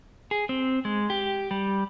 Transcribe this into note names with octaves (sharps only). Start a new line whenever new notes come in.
G#4
C4
G#3
G4
G3